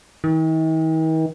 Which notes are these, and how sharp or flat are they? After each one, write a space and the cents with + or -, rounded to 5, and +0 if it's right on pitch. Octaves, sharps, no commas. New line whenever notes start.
D#3 +45